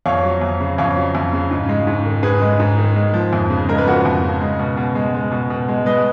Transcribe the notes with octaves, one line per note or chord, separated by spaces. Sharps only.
F2 C#5 F5
F#3
F2
C#3
F2 C#5 F5
F#3
F2
C#3
G#2
G#3
G#2
D#3
G#2 G#4 B4
G#3
G#2
D#3
G#3
F3
F2
C#3
G#3 A#4
B4
F3 F#4 A#4
F2
C#3
G#3
B2
B2
G#3
G#3
B2
B2
G#3
G#3 B4 D#5